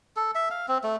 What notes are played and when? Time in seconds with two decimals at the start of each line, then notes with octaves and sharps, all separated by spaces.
0.16 A4
0.35 E5
0.51 F5
0.68 C4
0.83 A3